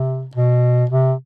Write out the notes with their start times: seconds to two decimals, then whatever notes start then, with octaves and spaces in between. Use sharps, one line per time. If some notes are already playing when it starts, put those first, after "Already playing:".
Already playing: C3
0.35 B2
0.90 C3